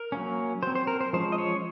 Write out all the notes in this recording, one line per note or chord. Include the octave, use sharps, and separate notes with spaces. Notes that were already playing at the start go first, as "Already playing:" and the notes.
Already playing: A#4
F#3 A#3 C#4
F#3 C4 C5
C5
A#4
C5
F3 G#3 C#4 C5
D#5
C#5